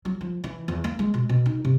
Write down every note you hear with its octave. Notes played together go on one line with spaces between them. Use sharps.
F#3
F3
E3
E2
A#3
G#3
B2
B2
D#4
C3